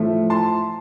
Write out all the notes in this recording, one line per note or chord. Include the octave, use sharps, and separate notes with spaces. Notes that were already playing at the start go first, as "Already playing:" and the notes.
Already playing: A2 F3 A3
A5 C6